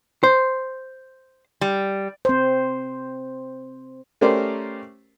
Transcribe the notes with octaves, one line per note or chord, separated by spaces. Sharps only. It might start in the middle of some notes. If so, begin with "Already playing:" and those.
C5
G3
C4 C5
A3 C#4 G4 A#4 C5 D5